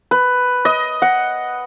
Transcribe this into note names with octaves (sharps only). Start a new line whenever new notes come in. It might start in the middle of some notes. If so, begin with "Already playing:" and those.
B4
D#5
F#5